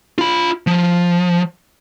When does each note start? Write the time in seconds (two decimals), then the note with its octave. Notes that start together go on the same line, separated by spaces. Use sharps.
0.18 F4 B5
0.67 F3